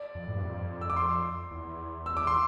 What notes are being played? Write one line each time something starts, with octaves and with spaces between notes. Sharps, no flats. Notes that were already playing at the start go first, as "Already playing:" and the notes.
Already playing: D5
F2
A2
G2
F2
E6
D6
C6
E2
E6
D6
C6